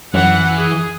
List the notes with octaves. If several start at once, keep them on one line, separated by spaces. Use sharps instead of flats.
F#2 E3 F#5
G#4